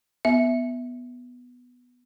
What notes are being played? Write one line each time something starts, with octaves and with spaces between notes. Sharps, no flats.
B3 E5